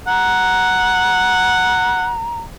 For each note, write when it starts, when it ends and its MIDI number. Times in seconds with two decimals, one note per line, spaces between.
0.07 2.10 78
0.07 2.38 82